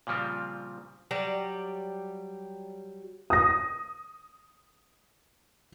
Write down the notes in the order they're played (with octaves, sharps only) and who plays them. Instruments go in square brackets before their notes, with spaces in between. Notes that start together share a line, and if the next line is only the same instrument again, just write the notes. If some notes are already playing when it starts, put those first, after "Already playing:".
[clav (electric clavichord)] A#2 C#3 F3 G3 C4
[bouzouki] F#3 G3 D5
[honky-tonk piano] D#6 A#6